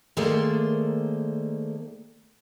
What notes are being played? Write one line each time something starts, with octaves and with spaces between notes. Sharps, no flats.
D#3 A3 A#3 G#4 C5 D5